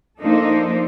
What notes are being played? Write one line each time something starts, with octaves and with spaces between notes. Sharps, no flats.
F3 A#3 D4 D#4 A4 C5